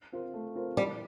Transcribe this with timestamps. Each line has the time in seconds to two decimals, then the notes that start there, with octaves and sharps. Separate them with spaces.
0.12 C4 F4 A#4
0.34 A3
0.56 C4 F4 A#4
0.77 E3 G3